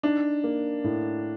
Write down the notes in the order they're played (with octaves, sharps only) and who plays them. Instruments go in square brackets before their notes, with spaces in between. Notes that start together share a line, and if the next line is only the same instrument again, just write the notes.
[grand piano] D4 [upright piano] D#4
[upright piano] A#3
A2